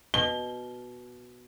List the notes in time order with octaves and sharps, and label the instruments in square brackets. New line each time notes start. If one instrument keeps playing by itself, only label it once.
[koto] B2 [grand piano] G7